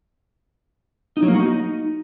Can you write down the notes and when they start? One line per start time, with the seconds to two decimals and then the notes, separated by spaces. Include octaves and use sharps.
1.17 D#4
1.22 F#3
1.28 A#3
1.34 F#4
1.40 D#4